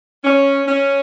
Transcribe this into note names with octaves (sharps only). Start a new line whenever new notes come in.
C#4
C#4